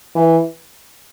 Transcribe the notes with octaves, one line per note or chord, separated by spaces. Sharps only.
E3